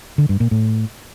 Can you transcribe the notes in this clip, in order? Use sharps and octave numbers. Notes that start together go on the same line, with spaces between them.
D3
G2
A#2
A2